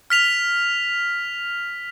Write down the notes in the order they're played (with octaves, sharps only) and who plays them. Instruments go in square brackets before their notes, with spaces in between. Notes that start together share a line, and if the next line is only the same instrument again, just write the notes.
[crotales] F6 B6 F7